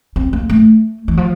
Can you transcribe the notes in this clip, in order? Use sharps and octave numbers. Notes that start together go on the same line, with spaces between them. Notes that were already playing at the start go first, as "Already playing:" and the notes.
C4
A#3
A3
E3
F3